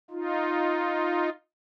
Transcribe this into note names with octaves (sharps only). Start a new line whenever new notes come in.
D#4 F4